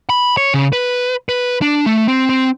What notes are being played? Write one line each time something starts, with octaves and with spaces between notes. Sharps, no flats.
B5
C#5
C#3
B4
B4
D4
A3
C4
C4